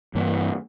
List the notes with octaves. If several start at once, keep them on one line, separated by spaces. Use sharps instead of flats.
G2 E3 A#3